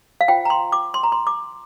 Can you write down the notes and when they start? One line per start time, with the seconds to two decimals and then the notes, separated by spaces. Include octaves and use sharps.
0.21 F5
0.28 F4 C5 G5
0.45 A#5
0.50 C6
0.72 D6
0.94 C6
1.03 A#5
1.12 C6
1.27 D6